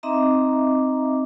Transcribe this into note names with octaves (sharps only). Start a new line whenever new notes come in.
C4 D#4 D#5 E5 A#5 D6